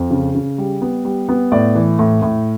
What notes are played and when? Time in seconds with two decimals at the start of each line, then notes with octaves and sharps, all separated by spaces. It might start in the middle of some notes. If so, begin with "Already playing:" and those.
Already playing: F2
0.11 C#3
0.35 C#3
0.58 G3
0.82 B3
1.05 G3
1.29 B3
1.52 A2 D5
1.75 E3
1.99 A2
2.22 A2